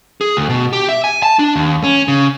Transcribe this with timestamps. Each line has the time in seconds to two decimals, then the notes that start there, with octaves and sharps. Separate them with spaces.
0.21 G#4
0.37 D2
0.50 B2
0.73 G4
0.89 E5
1.04 G#5
1.23 A5
1.39 D4
1.56 D#2
1.84 C#4
2.08 C#3